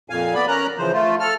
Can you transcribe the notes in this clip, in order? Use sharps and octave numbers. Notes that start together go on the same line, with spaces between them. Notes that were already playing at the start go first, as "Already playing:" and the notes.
F2 A#2 F5 G#5
B3 D5 B5
C#4 A#4 A#5 F#6
C#3 E3 F3 C5
A3 F4
A4 F6